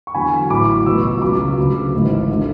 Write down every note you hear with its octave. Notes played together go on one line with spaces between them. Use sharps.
C#6
E2 D3 F#3 G#5 B5
A1 A2 F#3 B5 D6
C#2 B2 F#3 C#6 E6
C#2 C#3 F#3 B5 D6
D2 C#3 F#3
G#1 G#2 E3
D3 F#3